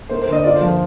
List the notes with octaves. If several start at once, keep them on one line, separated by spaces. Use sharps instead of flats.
A#3 C5
C5
D3 D#5
F4 D5
C5
F3
C5